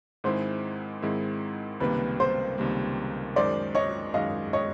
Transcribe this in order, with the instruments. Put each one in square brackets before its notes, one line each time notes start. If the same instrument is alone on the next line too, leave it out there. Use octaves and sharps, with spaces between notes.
[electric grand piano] G#2 D#3 G#3 C4 E4 [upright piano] C5
[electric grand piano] G#2 D#3 G#3 C4 E4
[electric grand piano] C#2 C3 D#3 G3 A#3 [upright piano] B4
[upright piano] C5
[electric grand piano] C#2 C3 D#3 G3 A#3
[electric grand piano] F#2 D#3 G#3 [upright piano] C5 D5
[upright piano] C#5 D#5
[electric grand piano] F#2 D#3 G#3 [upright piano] D#5 F5
[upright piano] C#5 D#5